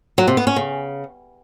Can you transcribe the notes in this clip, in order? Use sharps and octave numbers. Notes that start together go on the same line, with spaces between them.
F#3
C3
B3
C#4
C#3